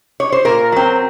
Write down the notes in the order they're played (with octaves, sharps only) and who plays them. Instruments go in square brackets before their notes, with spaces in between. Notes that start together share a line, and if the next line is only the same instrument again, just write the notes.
[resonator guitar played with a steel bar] C#5
C5
A#2 A#4
F#3 C4